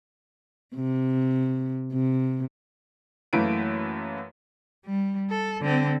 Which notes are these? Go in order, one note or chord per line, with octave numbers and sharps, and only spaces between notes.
C3
C3
F#2 E3 A3 A#3 B4 D7
G3
A4
D3 C4